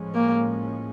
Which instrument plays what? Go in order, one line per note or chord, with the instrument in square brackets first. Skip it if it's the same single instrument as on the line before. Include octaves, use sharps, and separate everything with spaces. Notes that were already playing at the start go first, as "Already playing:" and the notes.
Already playing: [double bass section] A2 F3 G#3 C#4
[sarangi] A#3